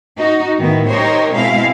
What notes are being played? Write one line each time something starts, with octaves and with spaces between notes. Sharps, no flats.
D#4 F#4
A2 D#3 B3 E4
D#4 G4 A#4 C5 C#5
B2 G#3 C4 E4 F5